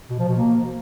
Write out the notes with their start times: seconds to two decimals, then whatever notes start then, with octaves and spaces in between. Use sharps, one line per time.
0.10 B2
0.19 F3
0.28 B2
0.37 A#3